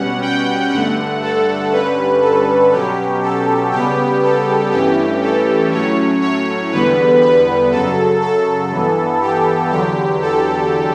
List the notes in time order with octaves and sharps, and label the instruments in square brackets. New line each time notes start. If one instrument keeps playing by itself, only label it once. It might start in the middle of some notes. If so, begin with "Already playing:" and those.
Already playing: [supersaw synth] B2 G3 C#4 F#5
G5
G2 D3 A3 F#5
A4
G2 D3 G3 C#4 B4
A4
B2 F#3 C#4 G4
A4
C#3 G3 B3 G4
A4
G2 E3 A3 C#4 G4
A4
A2 F#3 A3 C#4 C#5
C#5
E2 D3 G3 B3 B4
B4
F#2 C#3 F#3 A4
A4
G2 E3 B3
G4
E2 D3 F#3 G4
A4